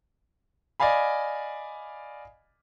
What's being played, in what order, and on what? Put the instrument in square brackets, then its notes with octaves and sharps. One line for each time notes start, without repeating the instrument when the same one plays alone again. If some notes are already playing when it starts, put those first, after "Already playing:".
[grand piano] D5 D#5 F5 G#5 B5